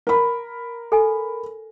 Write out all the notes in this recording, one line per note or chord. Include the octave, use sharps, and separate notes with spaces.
A#4 B5
A4 G#5